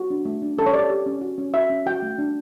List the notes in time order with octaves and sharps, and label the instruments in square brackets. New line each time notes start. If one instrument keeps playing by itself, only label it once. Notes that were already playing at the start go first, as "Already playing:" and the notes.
Already playing: [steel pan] F#4
D4
A3
D4
C#4 A4
C#5
G4 D5
G4
C#4
F#4
C#4
F#4 E5
C#4
F#4 G5
A3
D4